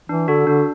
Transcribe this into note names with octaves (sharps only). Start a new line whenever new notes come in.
E3 D4
D3 F#4 A4
D3 D4